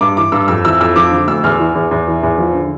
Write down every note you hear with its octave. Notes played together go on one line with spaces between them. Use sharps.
G2 D6
E3 D6
G2 E6
F2 E6
E3 E6
F2 E6
F3 D6
D3
D2 E6
E2 F6
E3
E2
E2
E3
E2
F3
D3